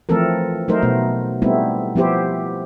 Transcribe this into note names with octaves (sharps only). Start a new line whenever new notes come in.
E3 F3 A3 C4 A4 A#4
F#3 A3 D#4 A#4 C5
B2 A3 B3
G3 A3 B3 C4 D#4 E4
F3 B3 E4 G4 C5